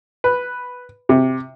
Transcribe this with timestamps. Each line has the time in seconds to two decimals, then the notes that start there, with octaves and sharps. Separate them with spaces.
0.24 B4
1.09 C3